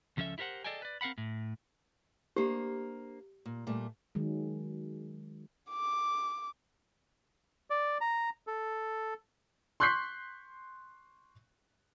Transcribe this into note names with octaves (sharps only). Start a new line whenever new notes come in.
C#2 F3 C#4 A4 E5
E4 G4 A#4 C5 F#5
G#4 A4 D5 D#5 G5 G#5
B4 D5
C4 A#4 F5 F#5 B5
A2
A#3 D4 G4 C5
A#2
A#2 G3 A3
D#3 F#3 G#3
D6
D5
A#5
A4
C6 C#6 F#6 G6 B6 C7